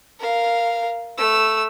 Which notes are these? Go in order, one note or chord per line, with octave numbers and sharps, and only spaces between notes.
A#4 F5
A3 E6